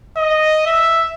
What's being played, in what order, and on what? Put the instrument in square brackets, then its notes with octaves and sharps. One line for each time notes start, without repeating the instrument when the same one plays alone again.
[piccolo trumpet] D#5
E5